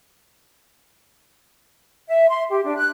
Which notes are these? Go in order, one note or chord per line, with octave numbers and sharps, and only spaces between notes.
E5
C6
G4
D4
F#6